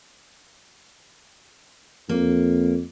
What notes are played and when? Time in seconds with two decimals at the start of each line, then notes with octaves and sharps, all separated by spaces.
2.09 F2 A#3